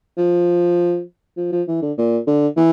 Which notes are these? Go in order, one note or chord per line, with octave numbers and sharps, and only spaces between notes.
F3
F3
F3
E3
D3
A#2
D3
E3